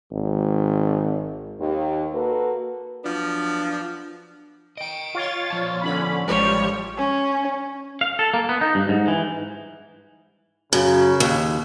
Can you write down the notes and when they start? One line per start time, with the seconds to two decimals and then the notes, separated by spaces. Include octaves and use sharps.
0.12 G#1
1.59 D#2
2.13 A#3 F#4 A4 B4
3.04 F3 F#3 B3 D4
4.77 D#5 G5 D7
5.15 F4 C#5 A6
5.50 F3 D5 A5
5.81 D3 C#4 B5
6.27 A1 F3 G3 G#3 C#5
6.97 C#4
8.01 F5
8.19 A4
8.34 A#3
8.49 B3
8.61 D#4
8.75 G2
8.89 G#2
9.08 E3
10.73 F#2 C#3
11.20 D#2